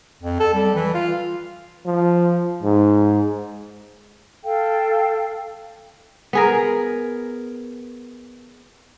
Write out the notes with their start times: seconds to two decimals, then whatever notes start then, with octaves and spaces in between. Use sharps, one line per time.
0.22 F2
0.40 A4
0.54 G3
0.75 E3
0.94 F4
1.86 F3
2.63 G#2
4.43 A4 F5 G5
6.33 B3 G#4 A#4